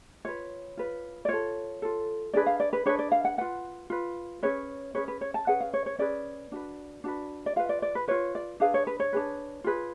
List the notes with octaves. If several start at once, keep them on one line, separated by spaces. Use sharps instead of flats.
F4 B4 C#5
F4 B4
D5
F4 A4 C#5
F4 A4
D4 G#4 B4 D5
F5
D5
B4
D4 G#4 B4 C#5
D5
F5
F#5
F4 B4 F#5
F4 B4
C#4 G#4 B4 C#5
C#4 G#4 B4 C#5
B4
C#5
A5
C#4 G#4 B4 F#5
F5
C#5
C#5
C#4 G#4 B4 D5
D4 F#4 B4
D4 F#4 B4
D5
F4 B4 F5
D5
D5
B4
F4 B4 C#5
D5
D4 G#4 B4 F5
C#5
B4
C#5
D4 G#4 B4
F4 G#4 B4